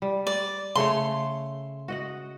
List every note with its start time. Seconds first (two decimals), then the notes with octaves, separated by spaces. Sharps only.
0.02 G3
0.27 D5
0.75 C#3 A3 C#5 C6
1.88 F#4 D#5 F#5